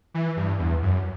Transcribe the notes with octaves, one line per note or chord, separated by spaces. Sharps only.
E3
G2
E2
F#2